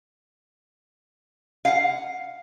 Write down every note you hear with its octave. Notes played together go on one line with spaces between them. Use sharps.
F5 F#5